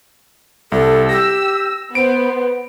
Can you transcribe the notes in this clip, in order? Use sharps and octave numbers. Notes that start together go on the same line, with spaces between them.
C2 A4
G4 E6 A#6
B3 C5 D7